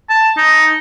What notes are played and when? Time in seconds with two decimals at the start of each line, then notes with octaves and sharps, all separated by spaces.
0.09 A5
0.37 D#4